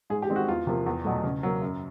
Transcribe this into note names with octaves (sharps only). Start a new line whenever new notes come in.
G#2 G#4
G4
D#3 G#3 C4
F#4
E2 F4
C3 F3 A#3
E2
B2 F#3 A3
C#3
F#3 A#3
F#2